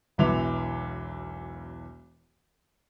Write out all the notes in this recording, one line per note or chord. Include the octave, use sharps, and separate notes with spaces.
E1 B1 E3 E5 D6 F7